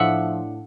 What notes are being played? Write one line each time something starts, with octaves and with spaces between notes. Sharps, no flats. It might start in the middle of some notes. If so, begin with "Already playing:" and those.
Already playing: A2 F3 D4 E5 F#5